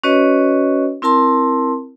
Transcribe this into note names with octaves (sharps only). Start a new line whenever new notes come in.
C#4 F#4 B4 C#5 D#5
C4 E4 A#4 A5 C6